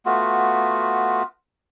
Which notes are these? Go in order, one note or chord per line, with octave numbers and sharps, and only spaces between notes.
A3 B3 F4 F#4